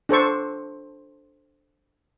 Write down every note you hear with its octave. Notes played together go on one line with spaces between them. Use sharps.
D4 A4 C5 C#6